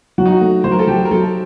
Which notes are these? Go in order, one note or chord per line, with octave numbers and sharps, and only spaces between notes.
F#3 F#4
D#4
F#4
A3
F#3 C5
A#4
A4
F#3 G4
A#4
F#3 A4